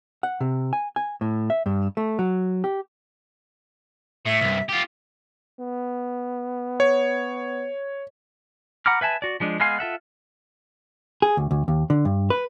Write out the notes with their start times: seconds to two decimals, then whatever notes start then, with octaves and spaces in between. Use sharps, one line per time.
0.23 F#5
0.41 C3
0.73 G#5
0.96 G#5
1.21 A2
1.50 E5
1.66 G2
1.97 A3
2.19 F#3
2.64 G4
4.25 A2 E5
4.41 C2 G2
4.69 F4 G4
5.59 B3
6.80 C#5
8.86 F#5 A#5 B5 D6 F6
9.01 B4 E5 G#5 A5
9.22 F#4 D5
9.40 F3 G#3 D4
9.60 G#3 B3 F5 G#5 C6
9.79 F4 A4 E5 F#5
11.22 G#4
11.37 D2
11.51 D2
11.68 D#2
11.90 D3
12.05 G2
12.30 B4